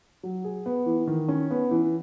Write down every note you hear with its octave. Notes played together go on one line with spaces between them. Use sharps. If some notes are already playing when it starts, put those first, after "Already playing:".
F#3
G#4
B3
E3
D#3
C#4
B3
E3